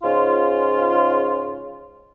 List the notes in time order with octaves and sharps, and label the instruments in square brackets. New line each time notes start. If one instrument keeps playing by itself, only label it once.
[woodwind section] G#2 C#3 F4